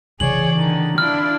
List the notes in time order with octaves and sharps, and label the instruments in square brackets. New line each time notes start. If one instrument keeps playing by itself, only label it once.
[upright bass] C#3 E3 [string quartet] G#4 C#5 D5 [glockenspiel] F#7
[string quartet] D3 D#3
[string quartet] D4 E4 F4 [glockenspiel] F6